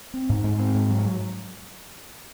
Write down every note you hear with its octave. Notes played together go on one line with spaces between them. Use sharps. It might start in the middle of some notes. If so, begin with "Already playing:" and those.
C4
G#2
G#2
C4
G#2
F#3
F#3